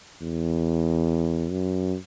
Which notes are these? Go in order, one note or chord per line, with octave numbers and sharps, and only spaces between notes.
E2
F#2